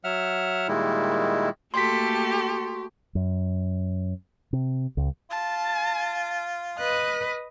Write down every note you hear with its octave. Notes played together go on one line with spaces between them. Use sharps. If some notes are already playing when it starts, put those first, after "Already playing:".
F#3 E5 F#5 F6
A#2 D#3 G3 G#3 E4
A3 A#3 F#4 G4 A4 C6 B6
F#2
C3
C#2
F4 A5
B4 D#5 F#6